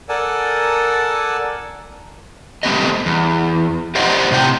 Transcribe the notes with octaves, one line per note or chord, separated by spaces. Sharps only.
A4 A#4 D5 F#5 G#5 A5
G3 A3 B3 C4 G4 D#5
E2
G4 C5 D5 D#5 F#5
A2 C3 C5 G5